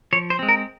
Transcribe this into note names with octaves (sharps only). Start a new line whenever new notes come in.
F3 C#5
C5
G#3 C4
A#4